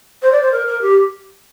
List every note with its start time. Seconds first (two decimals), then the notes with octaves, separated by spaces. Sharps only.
0.23 C5
0.32 D5
0.42 C5
0.52 A#4
0.67 A#4
0.82 G4